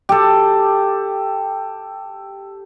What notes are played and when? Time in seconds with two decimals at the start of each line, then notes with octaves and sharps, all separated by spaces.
0.09 G4 A4